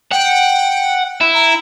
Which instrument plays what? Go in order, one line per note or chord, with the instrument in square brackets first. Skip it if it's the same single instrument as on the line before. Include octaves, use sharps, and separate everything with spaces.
[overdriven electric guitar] F#5 [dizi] G5
[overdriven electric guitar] E4
[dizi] A#5